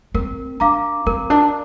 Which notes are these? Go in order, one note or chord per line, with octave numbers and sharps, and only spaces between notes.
C4 A#4
D4 F5 A#5 D6
C4 A#4
D4